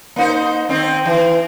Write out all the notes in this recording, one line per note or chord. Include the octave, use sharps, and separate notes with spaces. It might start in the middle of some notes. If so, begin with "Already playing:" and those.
A#3 D#4 C5
D#3 C4 D#4
E3